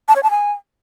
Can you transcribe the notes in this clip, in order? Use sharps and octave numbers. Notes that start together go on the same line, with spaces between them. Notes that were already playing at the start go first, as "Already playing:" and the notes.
A5
C#5
A5
G#5